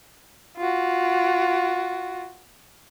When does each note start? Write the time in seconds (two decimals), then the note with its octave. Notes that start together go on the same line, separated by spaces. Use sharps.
0.57 F4 F#4